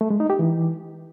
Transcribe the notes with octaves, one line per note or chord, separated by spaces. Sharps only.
A3
G#3
D#4
G4
E3